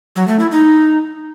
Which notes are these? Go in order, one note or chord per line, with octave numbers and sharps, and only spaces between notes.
F#3
A3
E4
D#4